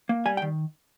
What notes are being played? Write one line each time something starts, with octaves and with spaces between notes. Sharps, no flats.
A#3
G3 G#5
G5
D#3